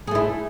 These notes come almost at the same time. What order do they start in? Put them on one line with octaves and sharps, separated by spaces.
G#4 A3 E4